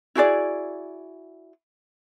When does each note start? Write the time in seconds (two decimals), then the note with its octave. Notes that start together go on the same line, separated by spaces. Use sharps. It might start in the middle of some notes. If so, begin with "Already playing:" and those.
0.15 E4 F#4 G#4 D5